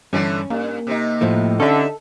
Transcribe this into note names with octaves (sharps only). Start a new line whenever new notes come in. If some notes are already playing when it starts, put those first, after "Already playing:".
G2 D3 E3 A3 C#4
G2 A#3
C3 D#4
A2 F3 A3
D3 C#4 D#4 A4 E5